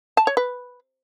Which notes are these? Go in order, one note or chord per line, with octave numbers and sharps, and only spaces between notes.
A5
C#5
B4